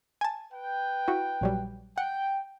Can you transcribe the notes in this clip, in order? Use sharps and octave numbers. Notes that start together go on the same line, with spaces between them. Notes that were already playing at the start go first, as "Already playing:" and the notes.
G#5 A5
B4 G5
E4 F#4
A#1 F#3 G3
F#5 G5